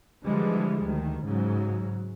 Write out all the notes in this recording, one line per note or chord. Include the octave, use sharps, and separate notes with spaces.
D3 E3 F3 G3 G#3
D2 D#3
G#2 C#3 F#3